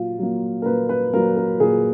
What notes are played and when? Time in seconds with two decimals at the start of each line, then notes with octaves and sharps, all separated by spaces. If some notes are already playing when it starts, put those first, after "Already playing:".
Already playing: A#2 F#3 A#3 F4
0.19 F#3 A#3
0.62 A#4
0.66 A#2 B4
0.89 B4
1.13 F#3 A#3 A#4
1.37 A#4
1.60 A#2 G#4